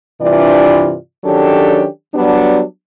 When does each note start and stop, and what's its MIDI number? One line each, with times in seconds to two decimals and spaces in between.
0.21 0.94 43
0.21 0.94 48
0.21 0.94 52
0.21 0.94 62
0.21 0.94 65
0.21 0.94 74
1.24 1.86 51
1.24 1.86 54
1.24 1.86 61
1.24 1.86 62
1.24 1.86 67
1.24 1.86 69
2.15 2.62 54
2.15 2.62 55
2.15 2.62 59
2.15 2.62 62